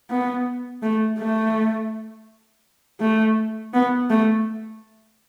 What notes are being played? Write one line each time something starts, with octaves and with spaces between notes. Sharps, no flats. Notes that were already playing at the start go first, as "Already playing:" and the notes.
B3
A3
A3
A3
B3
A3